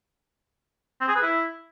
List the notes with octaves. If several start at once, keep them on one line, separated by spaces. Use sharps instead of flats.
C4
G#4
B4
E4